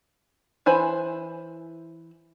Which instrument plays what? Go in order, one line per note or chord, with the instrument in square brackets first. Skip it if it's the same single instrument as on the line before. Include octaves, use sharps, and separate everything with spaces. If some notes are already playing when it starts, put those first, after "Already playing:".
[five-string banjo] E3 C5 G#5 B5